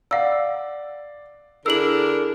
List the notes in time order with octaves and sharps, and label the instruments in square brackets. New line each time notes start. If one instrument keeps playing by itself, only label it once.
[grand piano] D5 F#5 C7 [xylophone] F5 E6
[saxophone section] D3 D4 A#4 [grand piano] E4 G#4 [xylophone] E6 F#7